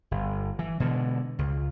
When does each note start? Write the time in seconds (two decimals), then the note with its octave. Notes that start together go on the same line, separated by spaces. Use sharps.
0.11 G1
0.59 E3
0.80 B2 D3 G#3
1.39 C#2